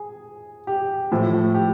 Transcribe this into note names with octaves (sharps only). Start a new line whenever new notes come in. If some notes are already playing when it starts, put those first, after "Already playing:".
Already playing: G#4
G4
A2 F3 A3
G4